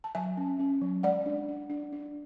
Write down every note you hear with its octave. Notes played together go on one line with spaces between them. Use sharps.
A5
F#3 E5 G#5
C#4
C#4
F#3
G#3 D5 F#5
D4
D4
D4
D4